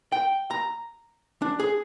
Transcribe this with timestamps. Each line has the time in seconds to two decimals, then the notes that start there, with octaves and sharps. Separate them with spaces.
0.12 G5
0.51 A#5
1.42 D4
1.60 G#4